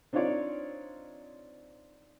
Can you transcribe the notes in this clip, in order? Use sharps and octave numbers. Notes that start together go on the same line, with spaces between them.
C4 D4 D#4 F4 C#5 D5